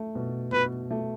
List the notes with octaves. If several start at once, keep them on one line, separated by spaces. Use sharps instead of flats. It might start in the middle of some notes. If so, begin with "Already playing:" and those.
Already playing: A3
B2
B2 B4
A3